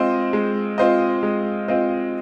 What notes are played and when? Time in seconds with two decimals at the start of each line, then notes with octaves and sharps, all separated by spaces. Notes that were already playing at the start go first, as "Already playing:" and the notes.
Already playing: G#3 C4 F4 C5 D#5
0.33 G#3
0.78 C4 F4 C5 D#5
1.23 G#3
1.68 C4 F4 C5 D#5